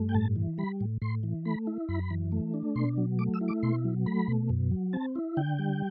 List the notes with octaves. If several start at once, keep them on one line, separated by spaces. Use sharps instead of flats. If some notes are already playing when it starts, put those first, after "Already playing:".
Already playing: G2 A3
G5
A2 A5
E3
G3 B5
A2
A2 C6
E3
A3 B5
E4
F#2 B5
E3
A3
D4
B2 C6
F#3
A3 D6
E6
E4
D6
B2 C6
F#3
A3 B5
B2
F#2
F#3
C4 A5
E4
D3 G5
G3